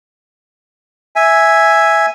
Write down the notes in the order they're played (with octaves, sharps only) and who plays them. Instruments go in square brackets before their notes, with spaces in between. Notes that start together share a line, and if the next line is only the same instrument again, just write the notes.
[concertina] E5 G#5